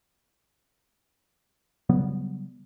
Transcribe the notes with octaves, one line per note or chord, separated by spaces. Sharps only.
C#3 F#3 G3 B3